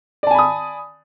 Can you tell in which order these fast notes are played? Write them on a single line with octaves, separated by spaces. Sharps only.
D5 A5 G#5 B5 D#6